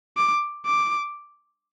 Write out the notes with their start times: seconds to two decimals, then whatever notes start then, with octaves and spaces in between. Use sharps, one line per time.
0.17 D6
0.66 D6